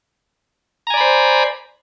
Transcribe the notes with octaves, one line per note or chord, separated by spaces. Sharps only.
C5 D5 G#5 A#5 B5